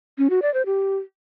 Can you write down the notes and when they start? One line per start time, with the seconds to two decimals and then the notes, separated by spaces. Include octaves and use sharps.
0.18 C#4
0.30 F#4
0.42 D5
0.54 C5
0.66 G4